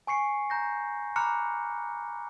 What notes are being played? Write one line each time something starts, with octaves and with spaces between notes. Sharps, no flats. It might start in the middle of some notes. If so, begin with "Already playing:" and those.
G#5 C#6 C7 C#7
A#5 G6 A#6
A#5 B5 D6 F6 F#6 C#7